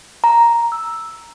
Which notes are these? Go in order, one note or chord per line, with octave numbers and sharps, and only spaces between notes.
A#5
E6